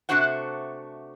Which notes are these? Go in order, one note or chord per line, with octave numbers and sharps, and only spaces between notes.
C3 A3 D4 F#4 C5 F#5